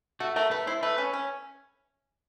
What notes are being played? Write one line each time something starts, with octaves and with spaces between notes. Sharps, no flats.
A3 F#4
A3 A#4
A3 B4
E4 C5
A3 B4
C#4
C#4